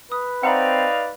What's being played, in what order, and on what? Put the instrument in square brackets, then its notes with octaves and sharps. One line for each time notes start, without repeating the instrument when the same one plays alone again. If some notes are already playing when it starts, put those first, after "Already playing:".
[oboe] B4 [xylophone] D#6
[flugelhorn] C4 [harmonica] D#4 D5 F5 [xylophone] F#5 A#5 B5